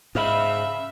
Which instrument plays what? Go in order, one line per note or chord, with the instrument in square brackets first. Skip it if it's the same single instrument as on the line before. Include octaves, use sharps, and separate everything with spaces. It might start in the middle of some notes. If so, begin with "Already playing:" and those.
[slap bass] G#2 [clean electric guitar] C#3 F5 B5 [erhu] E5